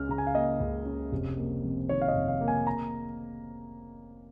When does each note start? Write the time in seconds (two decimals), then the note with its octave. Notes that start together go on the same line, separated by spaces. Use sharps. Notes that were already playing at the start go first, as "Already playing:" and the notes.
Already playing: C#2 C#4 F6
0.09 C#3 A#5
0.18 G#5
0.27 F5
0.34 A#3 D#5
0.60 C#2
0.85 C#4
1.12 F1
1.37 A#3
1.64 F2
1.89 D#3 C#5
2.02 F5
2.08 D#5
2.15 F1
2.28 F5
2.41 A#3
2.48 G#5
2.67 A#5